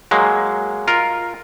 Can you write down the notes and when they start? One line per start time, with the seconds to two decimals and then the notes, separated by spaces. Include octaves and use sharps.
0.11 F#3 G#3 A#3
0.88 F4 A#4